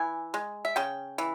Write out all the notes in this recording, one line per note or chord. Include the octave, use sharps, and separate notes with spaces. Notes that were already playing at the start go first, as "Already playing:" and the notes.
Already playing: E3 G#5
G#3
E5
C#3 G5
E3